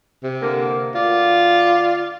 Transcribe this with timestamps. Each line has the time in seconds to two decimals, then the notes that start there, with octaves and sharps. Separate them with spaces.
0.23 C3
0.42 D3 A#3
0.95 D2 F4 D5